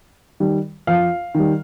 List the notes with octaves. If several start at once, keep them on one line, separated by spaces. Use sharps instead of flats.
D#3 G3
F2 F5
D#3 G3